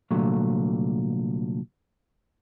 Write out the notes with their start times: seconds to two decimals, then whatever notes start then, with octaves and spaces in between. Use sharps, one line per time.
0.11 C2 A#2 D3 F#3 A3